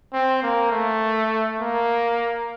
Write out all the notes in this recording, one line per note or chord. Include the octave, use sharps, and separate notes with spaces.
C4
A#3
A3
A#3